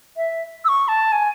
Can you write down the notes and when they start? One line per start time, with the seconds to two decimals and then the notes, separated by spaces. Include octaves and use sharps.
0.17 E5
0.65 E6
0.69 C#6
0.88 A5
1.12 G#5